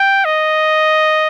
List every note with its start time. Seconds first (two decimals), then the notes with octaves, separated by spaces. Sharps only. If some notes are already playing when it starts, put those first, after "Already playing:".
Already playing: G5
0.25 D#5